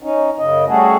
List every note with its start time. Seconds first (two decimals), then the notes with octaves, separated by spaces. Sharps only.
0.03 C#4 D#4
0.39 F#2 C#3 D#5
0.68 G3 A3 C#4 F#4 G#4 A4